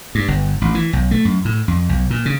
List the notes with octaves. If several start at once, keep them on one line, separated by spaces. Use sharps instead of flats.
G2
G1
A1
E3
B1
A3
F#2
A2
F2
B1
A#2
C#3